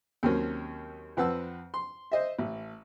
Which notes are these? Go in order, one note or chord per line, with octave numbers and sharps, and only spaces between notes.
D#2 F#3 C4 C#4 A#4
F2 C4 B4 F#5 A5 E6
C6
C5 D#5 E5
A1